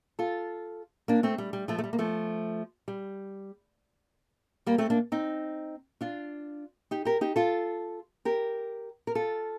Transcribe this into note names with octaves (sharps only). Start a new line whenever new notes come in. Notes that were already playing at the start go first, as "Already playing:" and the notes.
F4 A4
A#3 D4
A3 C4
G3
G3
F3 A3
A3
G3
A#3
F3 A3
G3
G3 A#3
A3 C4
A#3 D4
C4 D#4
D4 F4
D#4 G4
G4 A#4
D#4 G4
F4 A4
G4 A#4
A#4
F4 A4